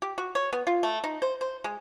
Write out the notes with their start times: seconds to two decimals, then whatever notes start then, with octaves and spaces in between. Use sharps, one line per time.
0.02 G4
0.18 F#4
0.35 C#5
0.53 B3
0.67 F4
0.83 A3
1.04 D#4
1.22 C5
1.41 C5
1.64 G#3